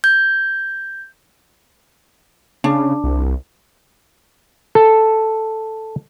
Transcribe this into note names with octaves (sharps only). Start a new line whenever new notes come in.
G6
C#3 D4
C2
A4